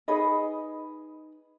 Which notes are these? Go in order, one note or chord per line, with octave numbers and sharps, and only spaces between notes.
D#4 G#4 B4 D#5